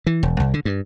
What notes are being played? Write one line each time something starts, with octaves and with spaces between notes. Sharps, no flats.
E3
E1
C2
D3
G2